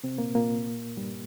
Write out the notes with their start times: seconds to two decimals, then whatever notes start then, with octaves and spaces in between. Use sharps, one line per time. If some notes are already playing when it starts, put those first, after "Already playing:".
0.04 C3 C4
0.18 A#2 A#3
0.35 A#2 A#3
0.97 G2 G3